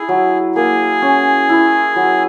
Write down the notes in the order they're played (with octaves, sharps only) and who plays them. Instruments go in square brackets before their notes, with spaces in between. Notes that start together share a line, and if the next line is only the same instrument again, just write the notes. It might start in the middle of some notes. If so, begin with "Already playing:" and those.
Already playing: [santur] E4 [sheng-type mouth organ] G#4
[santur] F#3
[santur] A#3 [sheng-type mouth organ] G#4
[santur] C#4
E4
F#3